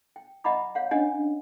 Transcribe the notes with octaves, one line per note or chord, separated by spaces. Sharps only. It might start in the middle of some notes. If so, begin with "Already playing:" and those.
G5
D#5 E5 F#5 A#5 B5 D6
C#5 F5 F#5
C#4 D4 C#5 D#5 F#5 G#5